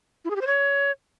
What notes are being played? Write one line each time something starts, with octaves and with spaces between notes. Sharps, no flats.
E4
G#4
G4
C5
C#5